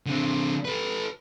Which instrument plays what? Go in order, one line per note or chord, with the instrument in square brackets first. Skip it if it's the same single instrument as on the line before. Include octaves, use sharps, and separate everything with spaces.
[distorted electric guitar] D3 C4
A4 B4